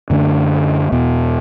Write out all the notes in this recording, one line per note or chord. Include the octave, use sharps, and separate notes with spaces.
F#2 D3 A3 D4
E2 B2 B3